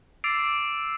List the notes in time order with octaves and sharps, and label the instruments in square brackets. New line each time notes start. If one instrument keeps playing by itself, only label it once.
[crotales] D6 E6 A6 C7 D7 F7